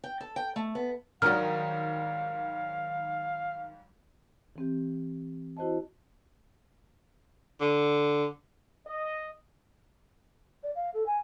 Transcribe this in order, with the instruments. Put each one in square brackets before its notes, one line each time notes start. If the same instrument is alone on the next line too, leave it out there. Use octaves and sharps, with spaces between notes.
[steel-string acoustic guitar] G5
A4
G5
A3
B3
[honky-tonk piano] G#2 F#3 G3 [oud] D#3 F#4 [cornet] F5 [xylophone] F6
[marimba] E3 C4 G4
E4 F#4 C5 D#5 A5
[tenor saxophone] D3
[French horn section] D#5
[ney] D5
F5
A4
G#5